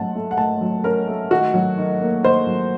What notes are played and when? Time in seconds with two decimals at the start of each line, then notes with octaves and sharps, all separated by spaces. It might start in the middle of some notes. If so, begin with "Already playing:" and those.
Already playing: A2 F#3 C#4 F#5 A5
0.15 A3
0.31 F#5
0.38 A2 A5
0.61 F#3
0.84 C#4 A#4
1.08 A3
1.30 D#3 F#4
1.54 F#3
1.78 D#3
2.00 A#3
2.24 D#3 C5
2.47 F#3